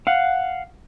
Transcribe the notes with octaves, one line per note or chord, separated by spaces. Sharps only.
F5 F#5